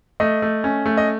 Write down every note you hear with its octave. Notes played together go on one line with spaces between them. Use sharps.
A3 D#5
A3
C#4
A3
D#5